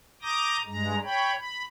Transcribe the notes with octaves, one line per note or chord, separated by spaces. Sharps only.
A#5 D6 D#6 G6 A#6
G2 G#3 A#5
C#5 G5 B5
B5